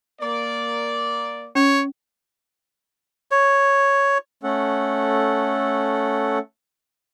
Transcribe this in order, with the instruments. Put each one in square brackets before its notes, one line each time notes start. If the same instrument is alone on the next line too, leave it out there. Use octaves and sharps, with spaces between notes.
[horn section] A#3 D5
[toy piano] C#4 [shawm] C#5
[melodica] C#5
[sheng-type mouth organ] A3 C#4 A4 F#5